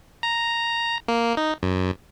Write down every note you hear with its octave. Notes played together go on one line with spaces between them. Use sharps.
A#5
A#3
D#4
F#2